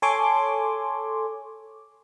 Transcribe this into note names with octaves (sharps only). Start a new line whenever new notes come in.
A4 C#5 G#5 C6 D6